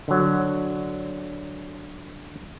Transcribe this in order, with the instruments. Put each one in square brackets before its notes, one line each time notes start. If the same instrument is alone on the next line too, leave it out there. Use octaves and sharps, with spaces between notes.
[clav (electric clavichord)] D3 F#3